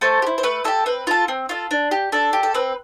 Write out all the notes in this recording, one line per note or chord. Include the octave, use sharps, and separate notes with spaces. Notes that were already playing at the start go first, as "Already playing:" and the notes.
A3 A4 C5
G4
E4
C5
A3 B4
E4 G4 A4
C4 B4
F4 A4
C4
F4 A4
D4
G4
D4 A4
G4
A4
C4 B4